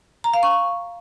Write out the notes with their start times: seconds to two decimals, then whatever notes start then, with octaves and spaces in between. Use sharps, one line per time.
0.24 A#5
0.34 F5
0.43 C#6